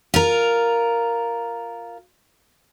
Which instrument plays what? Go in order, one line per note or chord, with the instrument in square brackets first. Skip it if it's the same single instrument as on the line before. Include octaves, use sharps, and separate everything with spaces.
[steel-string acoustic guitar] F4 A#4